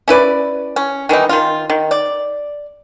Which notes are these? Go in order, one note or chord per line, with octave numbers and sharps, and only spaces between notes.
C#4 E4 B4 D5
C#4
D#3 E3 G3 D#4
D#3 F4
D#3
D5